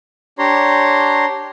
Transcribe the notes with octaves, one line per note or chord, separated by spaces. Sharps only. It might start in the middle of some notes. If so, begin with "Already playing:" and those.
D4 G4 C#5 A#5 C6